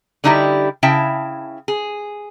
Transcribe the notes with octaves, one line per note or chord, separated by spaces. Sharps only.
D3 G3 D#4 E4 F#4 G4
C#3 E4 E5 G5 A5
G#4